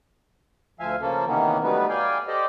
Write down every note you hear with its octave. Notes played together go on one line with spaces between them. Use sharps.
D2 F3 E5 F5 G#5
C#3 F3 A#3 C#4 A4
C3 D#3 E3 A#3 B3 C#4
F#3 G3 A3 B3 D#4 B4
D5 F5 G5 G#5
G4 A4 C5 D5 D#5